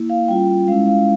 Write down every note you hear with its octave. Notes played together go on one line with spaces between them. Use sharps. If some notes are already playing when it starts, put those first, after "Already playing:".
Already playing: A#3 E4
F5
G3 C#4 F4 G5
G5
G#3 C#4 E4 F5
F5